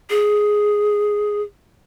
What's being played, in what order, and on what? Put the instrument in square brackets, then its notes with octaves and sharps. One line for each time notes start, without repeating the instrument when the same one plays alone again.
[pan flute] G#4